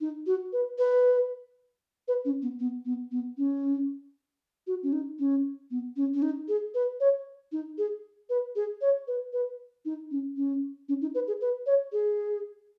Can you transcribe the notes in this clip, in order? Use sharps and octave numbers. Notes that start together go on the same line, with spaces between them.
D#4
F#4
B4
B4
B4
C#4
B3
B3
B3
B3
C#4
F#4
C#4
D#4
C#4
B3
C#4
C#4
D#4
G#4
B4
C#5
D#4
G#4
B4
G#4
C#5
B4
B4
D#4
C#4
C#4
C#4
D#4
B4
G#4
B4
C#5
G#4